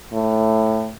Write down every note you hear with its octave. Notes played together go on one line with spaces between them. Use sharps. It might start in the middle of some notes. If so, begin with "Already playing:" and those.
A2